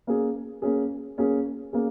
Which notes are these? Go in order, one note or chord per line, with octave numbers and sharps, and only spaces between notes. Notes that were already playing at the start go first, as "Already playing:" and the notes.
A#3 C#4 G#4
A#3 C#4 G#4
A#3 C#4 G#4
A#3 C#4 G#4